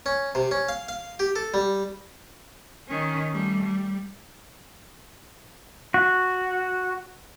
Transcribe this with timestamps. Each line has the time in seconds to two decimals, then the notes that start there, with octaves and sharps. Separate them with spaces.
0.06 C#4
0.35 C3
0.51 C#4
0.69 F5
0.89 F5
1.19 G4
1.36 A4
1.54 G3
2.88 D#3 C#4
3.32 G3 A3
3.64 G3
5.94 F#4